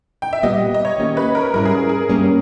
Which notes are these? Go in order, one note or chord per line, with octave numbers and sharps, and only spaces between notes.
G5
E5
A#2 G3 B3 G4 D#5
D#5
C#5
D#3 A#3 C#4 G4
B4
A#4
G#2 G3 C#4 E4 A#4
G#4
G#4
G2 G3 A#3 C#4